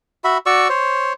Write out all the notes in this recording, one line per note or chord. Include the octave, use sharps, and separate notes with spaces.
F#4 E5 B5
F#4 D5 C#6 E6
C5 C#5